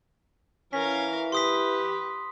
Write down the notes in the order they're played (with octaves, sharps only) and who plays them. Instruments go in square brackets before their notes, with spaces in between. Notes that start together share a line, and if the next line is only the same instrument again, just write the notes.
[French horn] E3 [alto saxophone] C#4 [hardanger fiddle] A#4 F5 [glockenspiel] B6
[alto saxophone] G4 [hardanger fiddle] B4 [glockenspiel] C6 D#6 B6